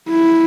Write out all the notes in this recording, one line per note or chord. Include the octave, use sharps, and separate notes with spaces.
E4